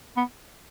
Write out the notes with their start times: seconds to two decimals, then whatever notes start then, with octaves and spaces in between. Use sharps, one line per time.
0.17 B3